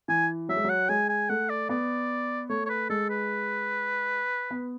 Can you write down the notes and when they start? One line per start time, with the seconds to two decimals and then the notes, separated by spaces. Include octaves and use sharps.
0.08 E3 G#5
0.49 F#3 E5
0.56 G#3
0.64 F#3 F#5
0.89 G#3 G#5
1.09 G#5
1.29 A3 F#5
1.49 D5
1.69 B3 D5
2.49 A3 C#5
2.66 C#5
2.69 B4
2.90 G#3 A4
3.10 B4
4.51 B3